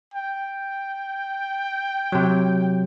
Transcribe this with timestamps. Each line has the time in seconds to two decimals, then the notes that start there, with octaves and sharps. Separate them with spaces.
0.14 G5
2.12 C3 F#3